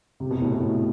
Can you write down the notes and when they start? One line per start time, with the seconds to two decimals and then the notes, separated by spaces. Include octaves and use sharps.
0.20 C3
0.31 B2
0.41 A2
0.52 A2